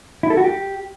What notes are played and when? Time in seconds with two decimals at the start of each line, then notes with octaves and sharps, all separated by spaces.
0.23 E4
0.30 A4
0.37 F#4
0.44 G4